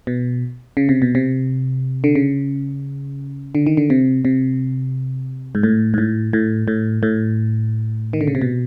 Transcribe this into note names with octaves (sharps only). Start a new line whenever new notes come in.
B2
C#3
C3
B2
C3
D3
C#3
D3
D#3
D3
C3
C3
G#2
A2
G#2
A2
A2
A2
A2
D#3
D3
C#3
C3
B2